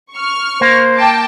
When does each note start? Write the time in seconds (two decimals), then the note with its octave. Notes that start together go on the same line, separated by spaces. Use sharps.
0.12 C#6 F6
0.61 A#3 C5
0.96 G5 A5 D6